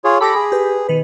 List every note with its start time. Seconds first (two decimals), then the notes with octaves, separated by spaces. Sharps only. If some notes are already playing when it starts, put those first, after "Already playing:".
0.04 F4 G#4 C#5
0.21 G4 A4 B5 D6 A#6
0.35 G#4
0.52 G4 B4
0.89 B2 D#3 B4